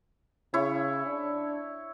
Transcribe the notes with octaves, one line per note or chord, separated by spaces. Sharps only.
C#3 E4 C#5
D4